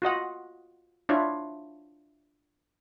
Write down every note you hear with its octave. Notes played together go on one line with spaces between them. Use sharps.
F4 F#4 D#5 F#5
D4 E4 F4 C#5